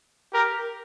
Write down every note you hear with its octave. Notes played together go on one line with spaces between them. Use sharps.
G4 A#4